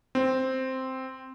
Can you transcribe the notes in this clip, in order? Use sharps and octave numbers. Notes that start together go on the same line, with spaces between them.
C4